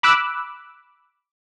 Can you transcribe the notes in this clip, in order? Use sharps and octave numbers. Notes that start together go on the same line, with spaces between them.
B5 D6 E6 F#6